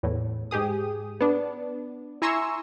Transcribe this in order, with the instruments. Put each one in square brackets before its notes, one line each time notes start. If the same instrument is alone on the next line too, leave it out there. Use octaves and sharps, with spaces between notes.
[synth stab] E2 A2
G#2 G4 G#4 D#6
B3 D4
E4 G#5 A#5 C6 C#6 E6